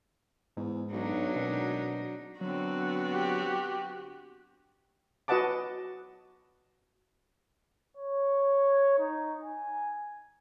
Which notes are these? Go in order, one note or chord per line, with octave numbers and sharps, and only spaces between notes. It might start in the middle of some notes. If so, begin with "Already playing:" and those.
E2 G#2
B1 F#3 D4 D#4
G#1 B2
D3 F#3 B3 C4 F#4
G4
F#4 B4 D#5 F#5 A5 D6
C#5
D#4
G#5